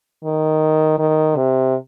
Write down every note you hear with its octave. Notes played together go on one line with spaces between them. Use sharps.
D#3
D#3
C3